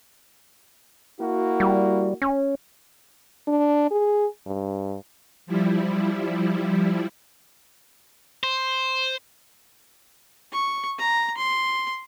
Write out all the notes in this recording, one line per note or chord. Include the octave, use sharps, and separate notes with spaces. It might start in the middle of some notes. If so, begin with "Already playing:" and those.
A#3 E4 F#4
G3
C#4
D4
G#4
G2
F3 G3 E4
C5
C#6
A#5
C6